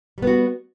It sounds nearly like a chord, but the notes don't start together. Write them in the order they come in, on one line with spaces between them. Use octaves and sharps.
G3 B3 F#4